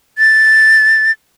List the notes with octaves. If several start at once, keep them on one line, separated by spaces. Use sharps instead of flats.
A6